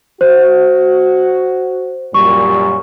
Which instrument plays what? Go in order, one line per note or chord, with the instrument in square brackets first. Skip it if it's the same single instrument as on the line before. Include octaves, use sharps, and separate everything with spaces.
[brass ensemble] F#4 [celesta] C5
[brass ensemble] F#2 A#2 G3 [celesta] C#6